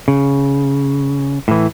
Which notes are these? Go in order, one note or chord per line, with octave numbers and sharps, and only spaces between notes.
C#3
A2 E3